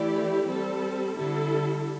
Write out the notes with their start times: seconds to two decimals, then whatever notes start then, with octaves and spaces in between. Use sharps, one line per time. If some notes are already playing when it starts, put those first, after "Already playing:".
Already playing: E3 A3 E4 G4 D5
0.47 G3 C4 A4
1.16 D3 G3 E4 A4